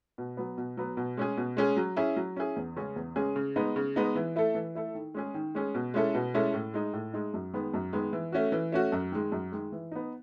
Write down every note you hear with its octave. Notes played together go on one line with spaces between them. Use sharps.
B2
F#3 B3
B2
F#3 B3
B2
G#3 C#4 G#4
B2
G#3 C#4 G#4
F#3
C#4 E4 G#4
F#3
C#4 E4 G#4
E2
C#3 G#3 C#4 G#4
E2
C#3 G#3 C#4 G#4
C#3
G#3 B3 D#4
C#3
G#3 B3 D#4
E3
A3 E4 A4
E3
A3 E4 A4
D#3
G#3 C#4 G#4
D#3
G#3 C#4 G#4
B2
G#3 C#4 E4 A4
B2
G#3 C#4 E4 A4
A2
G#3 D#4
A2
G#3 D#4
F#2
D#3 G#3 B3
F#2
D#3 G#3 B3
E3
A3 C#4 F#4
E3
A3 C#4 F#4
F#2
D#3 G#3
F#2
D#3 G#3
E3
B3 D#4